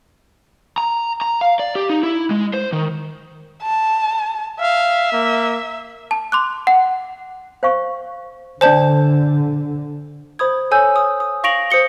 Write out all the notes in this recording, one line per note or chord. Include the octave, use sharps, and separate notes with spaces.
A#5
A#5
F5
D5
G4
D#4
E4
G#3
C5
D#3
A5
E5 F5
A#3
A5
C6 D6 F#6
F#5
C5 F5 C#6
D3 D4 C5 D5 G#5 A5 G6
C5 B5 D#6 G#6
A4 C#5 G#5 E6 G6
D#6
D#6
F5 C#6 A#6 D7 F7 F#7
C5 D#6 C#7 G7